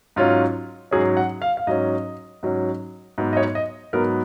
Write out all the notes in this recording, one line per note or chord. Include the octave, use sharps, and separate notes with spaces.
G#2 F#3 C#4 F4
G#2 F#3 C#4 G#4
F#5
F5
F5
G#2 F#3 C#4 D#5
G#2 F#3 C#4
G#2 F#3 B3
D#5
C#5
D#5
G#2 F#3 B3 A#4